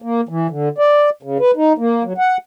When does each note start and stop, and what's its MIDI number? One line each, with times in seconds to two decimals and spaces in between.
0.02 0.21 58
0.29 0.47 52
0.50 0.69 50
0.78 1.10 74
1.23 1.38 49
1.39 1.51 71
1.56 1.73 63
1.78 2.03 58
2.04 2.13 54
2.18 2.37 78